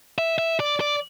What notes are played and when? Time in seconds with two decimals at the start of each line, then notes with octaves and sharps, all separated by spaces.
0.18 E5
0.38 E5
0.60 D5
0.80 D5